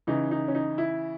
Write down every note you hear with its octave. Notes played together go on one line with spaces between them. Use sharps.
C#3 E3 D#4
D#4
C#4
D#4
E4